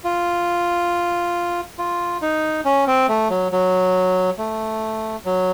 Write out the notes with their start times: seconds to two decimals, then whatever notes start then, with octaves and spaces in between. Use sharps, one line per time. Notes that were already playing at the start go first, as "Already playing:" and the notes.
0.04 F4
1.78 F4
2.22 D#4
2.65 C#4
2.87 C4
3.09 A3
3.30 F#3
3.52 F#3
4.38 A3
5.25 F#3